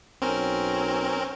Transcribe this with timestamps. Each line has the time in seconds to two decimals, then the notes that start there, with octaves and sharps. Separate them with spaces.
0.22 B1 C4 C#4 A#4